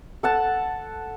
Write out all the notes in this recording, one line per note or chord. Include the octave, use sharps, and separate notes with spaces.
A4 F#5 A5